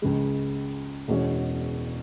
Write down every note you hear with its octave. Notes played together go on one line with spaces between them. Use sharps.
C#2 C#3 G#3
E1 E2 B2 G#3 C#4